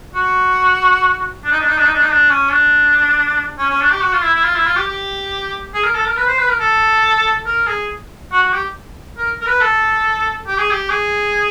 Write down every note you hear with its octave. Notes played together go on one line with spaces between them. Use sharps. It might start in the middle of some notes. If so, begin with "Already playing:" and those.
F#4
D4
D#4
D4
D#4
D4
D#4
D4
D#4
D4
C#4
D4
C#4
C#4
D4
G4
F#4
F4
E4
E4
F4
E4
F4
G4
G4
G#4
A#4
A4
A#4
B4
C5
B4
A#4
A4
A#4
G#4
F#4
F#4
G4
A#4
A#4
B4
A4
G4
G#4
G4
G#4